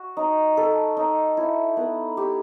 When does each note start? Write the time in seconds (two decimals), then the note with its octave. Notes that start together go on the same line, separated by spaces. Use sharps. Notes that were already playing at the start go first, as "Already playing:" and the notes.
Already playing: F#4
0.17 D#4
0.57 A4
0.97 D#4
1.37 E4
1.77 B3
2.17 G4